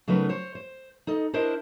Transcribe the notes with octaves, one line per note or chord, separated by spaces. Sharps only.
C#3 F#3 A3 D#4 A#4 B4
C5 C#5
C5
D#4 A4 D#5
D4 E4 A#4 C5 D#5